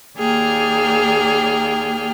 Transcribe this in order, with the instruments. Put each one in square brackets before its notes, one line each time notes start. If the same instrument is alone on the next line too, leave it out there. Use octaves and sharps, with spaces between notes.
[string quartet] D#2 A#3 G#4 D5 G5 F6